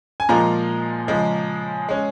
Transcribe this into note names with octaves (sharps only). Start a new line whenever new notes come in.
G#5
A#2 F3 G#3 F4 A#5
C#3 F3 G#3
G#3 C#4